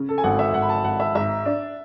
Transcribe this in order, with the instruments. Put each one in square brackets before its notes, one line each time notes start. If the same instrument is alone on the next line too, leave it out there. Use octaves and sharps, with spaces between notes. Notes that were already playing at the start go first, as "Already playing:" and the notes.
Already playing: [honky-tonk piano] C#3
[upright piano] A4
G#5
[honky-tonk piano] G#1 [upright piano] F#5
[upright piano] E5
[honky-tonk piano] G#1 [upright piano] F#5
[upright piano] B5
A5
[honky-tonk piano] G#1 [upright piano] F#5
[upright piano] E5
[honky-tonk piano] G#2 [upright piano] E5
[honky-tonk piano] D4